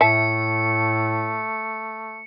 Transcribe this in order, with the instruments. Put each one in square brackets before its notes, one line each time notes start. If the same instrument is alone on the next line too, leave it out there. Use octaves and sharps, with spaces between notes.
[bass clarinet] A2 [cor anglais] A3 [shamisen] E5 A5 [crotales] C#7